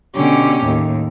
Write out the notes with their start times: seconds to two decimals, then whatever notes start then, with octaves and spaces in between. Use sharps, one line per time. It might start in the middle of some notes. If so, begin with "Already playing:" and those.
0.15 B2 D3 C#4 G4
0.64 D#2 A2